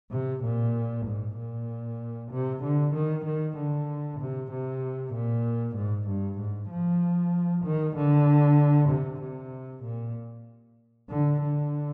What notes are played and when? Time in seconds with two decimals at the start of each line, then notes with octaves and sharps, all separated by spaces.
0.11 C3
0.43 A#2
1.06 G#2
1.38 A#2
2.31 C3
2.63 D3
2.94 D#3
3.25 D#3
3.57 D3
4.20 C3
4.51 C3
5.13 A#2
5.76 G#2
6.08 G2
6.39 G#2
6.70 F3
7.65 D#3
7.96 D3
8.90 C3
9.21 C3
9.83 A#2
11.10 D3
11.41 D3